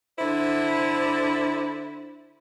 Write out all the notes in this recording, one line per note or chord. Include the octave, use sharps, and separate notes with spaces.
D3 E4 C5